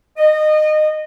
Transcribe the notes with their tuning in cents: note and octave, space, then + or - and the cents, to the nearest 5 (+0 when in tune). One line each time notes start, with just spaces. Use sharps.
D#5 -20